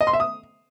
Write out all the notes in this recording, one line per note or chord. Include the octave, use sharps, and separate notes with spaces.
D#5
C6
E5
D#6